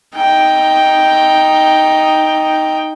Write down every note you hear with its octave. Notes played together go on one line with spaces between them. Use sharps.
D#4 G5